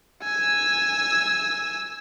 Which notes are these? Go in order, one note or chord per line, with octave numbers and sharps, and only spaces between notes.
G#5 E6